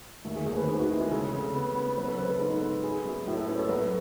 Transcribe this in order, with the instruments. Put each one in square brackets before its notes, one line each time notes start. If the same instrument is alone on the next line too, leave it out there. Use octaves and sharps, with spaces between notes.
[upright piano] D#2 [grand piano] A3
[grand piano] G#4
[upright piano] D#2 [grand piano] G#4
[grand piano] B4
[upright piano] D#3 [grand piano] B4
[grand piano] F#4
[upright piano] G#3 [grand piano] E4
[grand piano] G#4
[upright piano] C#3 [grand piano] A4
[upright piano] C#3
B3
B3
[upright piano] F#3 [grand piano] B4
[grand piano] A4
[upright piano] C#3 [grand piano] B4
[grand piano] A4
[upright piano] G#2
B3
[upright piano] B3 [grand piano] G#4
[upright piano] F#2
[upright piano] A2 [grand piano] F#4
[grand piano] A4
[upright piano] C#4 [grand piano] B4
[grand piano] A4
[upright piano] F#3 [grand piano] B3